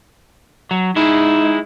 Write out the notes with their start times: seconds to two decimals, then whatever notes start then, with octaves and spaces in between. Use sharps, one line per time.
0.71 F#3
0.96 G#3 D#4 E4